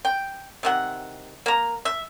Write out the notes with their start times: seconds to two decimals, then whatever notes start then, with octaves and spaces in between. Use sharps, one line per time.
0.05 G5
0.63 C3 D#3 F#5
1.46 A#3 A#5
1.85 E5